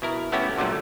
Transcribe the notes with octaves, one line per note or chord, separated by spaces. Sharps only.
B2 E4 A#4
A3 B3 C#4 E4 F#4 G4
A#2 D3 F#3 G3 A3